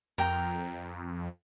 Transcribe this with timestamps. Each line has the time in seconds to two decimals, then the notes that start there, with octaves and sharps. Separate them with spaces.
0.18 F2 A#4 G5 A#5